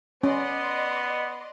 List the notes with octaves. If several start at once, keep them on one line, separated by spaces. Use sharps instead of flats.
B3 C#4 D5 D#5 C6